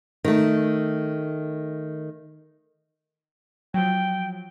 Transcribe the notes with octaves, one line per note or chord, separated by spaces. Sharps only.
D#3 A3
F3 F#3 G5